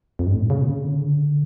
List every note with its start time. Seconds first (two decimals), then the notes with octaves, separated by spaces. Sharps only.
0.19 F2
0.26 G2
0.34 A2
0.42 A#2
0.50 C#3
0.61 A#2
0.66 C#3
0.84 D3
0.92 C#3
1.00 D3